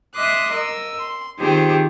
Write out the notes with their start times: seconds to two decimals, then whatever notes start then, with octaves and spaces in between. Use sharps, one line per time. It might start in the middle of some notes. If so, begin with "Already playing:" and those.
0.15 D#5 E5 C6 D6 D#6 F#6
0.51 A#4 D#5 E6
1.00 C6
1.40 D#3 C4 F4 G4 G#4 C5